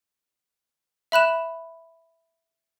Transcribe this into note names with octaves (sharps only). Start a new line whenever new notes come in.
E5 B5 F#6 E7